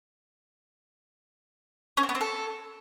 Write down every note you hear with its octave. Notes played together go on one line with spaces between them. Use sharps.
C#4
C4
B3
C4
A4